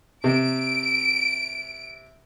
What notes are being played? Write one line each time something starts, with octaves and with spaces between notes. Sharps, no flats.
C3 D7